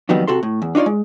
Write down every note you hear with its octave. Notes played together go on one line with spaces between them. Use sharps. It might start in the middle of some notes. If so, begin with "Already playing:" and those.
F2 D#3 F#3 G3 B3 D#4
C3 F#4 A4 C6
A2
E2
D4 D#4 F4 C#5 D5
G#3